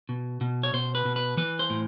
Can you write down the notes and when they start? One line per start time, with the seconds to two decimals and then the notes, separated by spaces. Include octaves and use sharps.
0.09 B2
0.41 B2
0.63 C#5
0.73 B2 C5
0.95 B4
1.05 B2
1.16 B4
1.37 E3 B4
1.59 C5
1.70 A2